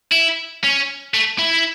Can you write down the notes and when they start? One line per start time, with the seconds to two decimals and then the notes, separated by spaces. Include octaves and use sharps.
0.12 E4
0.64 C#4
1.14 A3
1.39 E4